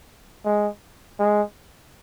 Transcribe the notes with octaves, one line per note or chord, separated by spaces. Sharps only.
G#3
G#3